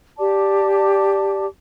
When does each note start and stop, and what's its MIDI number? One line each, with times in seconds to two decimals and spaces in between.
0.18 1.46 67
0.18 1.46 74
0.18 1.46 81
0.18 1.46 86